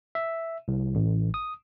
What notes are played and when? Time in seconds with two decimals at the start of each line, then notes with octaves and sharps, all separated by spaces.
0.15 E5
0.68 C2
0.95 A1
1.34 D#6